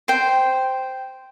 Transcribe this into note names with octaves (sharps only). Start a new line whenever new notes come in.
C5 G5